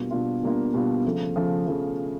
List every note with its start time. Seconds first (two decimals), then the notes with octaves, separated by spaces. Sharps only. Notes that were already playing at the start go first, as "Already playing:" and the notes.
Already playing: B2 G3 A#3 D4 F4
0.11 B2 G3 A#3 D4 F4
0.43 B2 G3 A#3 D4 F4
0.74 B2 G3 A#3 D4 F4
1.05 C#3 F3 A3
1.36 C#3 F3 A3
1.67 C#3 F3 A3